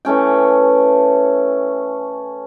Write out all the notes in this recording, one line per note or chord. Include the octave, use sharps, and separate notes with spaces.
E3 A3 C#4 G5